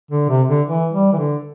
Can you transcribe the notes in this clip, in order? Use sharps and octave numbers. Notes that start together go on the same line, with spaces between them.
D3
C3
D3
E3
G3
E3
D3